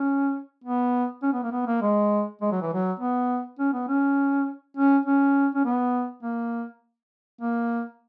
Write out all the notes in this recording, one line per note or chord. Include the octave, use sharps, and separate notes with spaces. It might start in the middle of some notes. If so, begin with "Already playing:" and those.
Already playing: C#4
B3
C#4
B3
A#3
B3
A#3
G#3
G#3
F#3
E3
F#3
B3
C#4
B3
C#4
C#4
C#4
C#4
B3
A#3
A#3